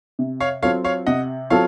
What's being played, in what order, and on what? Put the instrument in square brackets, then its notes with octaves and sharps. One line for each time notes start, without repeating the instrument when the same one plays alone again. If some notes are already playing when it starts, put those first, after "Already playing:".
[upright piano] C3
[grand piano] C#5 F5
[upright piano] F#3 C4 F4 A4 [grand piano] C#5 F5
[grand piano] C#5 F5
[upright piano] C3 [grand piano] D#5 F#5
[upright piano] F#3 C4 F4 A4 [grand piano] C#5 F5